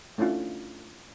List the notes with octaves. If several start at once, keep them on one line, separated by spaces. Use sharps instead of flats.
A3 C#4 D4 E4 F4